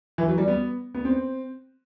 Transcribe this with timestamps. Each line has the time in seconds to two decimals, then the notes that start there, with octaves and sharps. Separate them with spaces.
0.18 E3
0.28 F#3
0.38 G3
0.48 B3
0.94 B3
1.05 C4